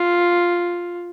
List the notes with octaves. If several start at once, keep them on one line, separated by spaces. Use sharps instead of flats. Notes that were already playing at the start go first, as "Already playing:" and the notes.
Already playing: F4